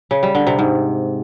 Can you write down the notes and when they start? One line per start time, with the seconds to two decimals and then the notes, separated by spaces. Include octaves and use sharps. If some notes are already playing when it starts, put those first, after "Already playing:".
0.11 C#3
0.23 G3
0.35 D3
0.47 C3
0.59 G#2